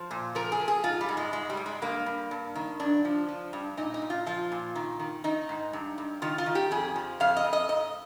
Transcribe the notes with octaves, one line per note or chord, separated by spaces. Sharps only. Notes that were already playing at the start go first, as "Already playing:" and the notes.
Already playing: F3 C5
A#2
F3 A#4
G#4
F3
G#4
G#2 F4
G3
G#2
G#3
G#2 G#3
G3
G#2
G#3
G2 A#3
G2
G2
D#3
G2 D4
F3
F3
G2
A#2 D#4
D#4
A#2
F4
F3 F4
A#2
D#3
D#3
D#3 D#4
G#2
G2
G2
D#3 F4
F4
D#3
G4
F2 G#4
F3
F2 F5
D#5
F2
D#5
G#2 D#5